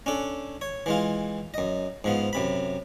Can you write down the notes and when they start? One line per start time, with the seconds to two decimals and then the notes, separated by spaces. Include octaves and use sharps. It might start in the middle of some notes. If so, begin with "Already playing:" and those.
0.06 C#4 D4 A4
0.61 C#5
0.86 E3 G#3 F4
1.54 F#2 D#5
2.04 G#2 F3 B3
2.33 F#2 C3 B5